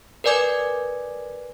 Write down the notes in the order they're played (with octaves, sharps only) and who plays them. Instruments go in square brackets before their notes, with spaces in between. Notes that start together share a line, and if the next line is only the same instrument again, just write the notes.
[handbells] A#4 B4 D5 G#5 D6 G#6